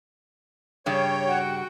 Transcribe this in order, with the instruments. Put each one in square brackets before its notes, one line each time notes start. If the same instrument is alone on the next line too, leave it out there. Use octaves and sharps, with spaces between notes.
[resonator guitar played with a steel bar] G2 C#3 [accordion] C#5 [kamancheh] G5
[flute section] F#4 F#5